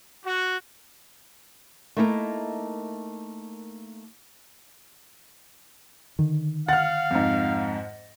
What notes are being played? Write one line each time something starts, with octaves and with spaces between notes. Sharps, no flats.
F#4
A3 A#3 D#4 E4 F#4 A#4
D3 D#3
F5 F#5 F6 A6
F2 G#2